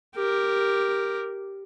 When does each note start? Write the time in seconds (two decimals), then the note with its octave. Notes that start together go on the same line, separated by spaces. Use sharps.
0.15 G4 A#4